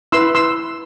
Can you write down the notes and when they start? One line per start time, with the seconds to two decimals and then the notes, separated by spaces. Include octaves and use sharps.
0.12 E4 B4 C6 E6
0.35 C6 E6